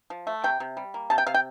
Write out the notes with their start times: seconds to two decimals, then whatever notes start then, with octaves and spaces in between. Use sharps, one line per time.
0.10 F3
0.27 A3
0.44 C3 G5
0.60 C3
0.77 G3
0.94 A#3
1.10 C3 A5
1.18 G5
1.27 C3 F5
1.34 G5